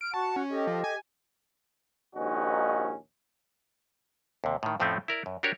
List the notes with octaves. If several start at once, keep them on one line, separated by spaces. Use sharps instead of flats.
F6 D7
F#4 F#5 A5 C#6
C#4
G4 A4 D#5
F3
G#5
A#1 D#2 G#2 C#4 D#4 F#4
D#2 C3
A2 D#3
F2 A2 F3 A3 C4 C#4
E4 A#4 D5
F#2
D4 F#4 G4 A#4 C#5